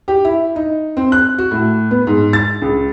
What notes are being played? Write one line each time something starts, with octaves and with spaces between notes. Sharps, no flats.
G4
E4
D#4
C4
F#6
F#4
A2
B3
G#2
A6
C#2